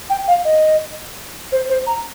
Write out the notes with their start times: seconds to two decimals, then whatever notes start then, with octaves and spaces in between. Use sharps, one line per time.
0.10 G5
0.28 F5
0.45 D#5
1.52 C5
1.69 C5
1.87 A#5